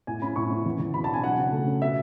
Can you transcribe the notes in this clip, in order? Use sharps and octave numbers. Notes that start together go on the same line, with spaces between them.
A2 G#5
C#4 B5
A2 C#6
C#4
E2
E2
B2 B5
A5
D4
G#5
F#3 F#5
C#3
A3
C#4
B2 E5